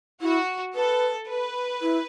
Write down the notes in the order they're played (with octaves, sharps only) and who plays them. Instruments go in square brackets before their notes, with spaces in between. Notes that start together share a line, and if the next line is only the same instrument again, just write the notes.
[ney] E4 [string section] F#4
[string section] A4 [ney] B4
[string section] B4
[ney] E4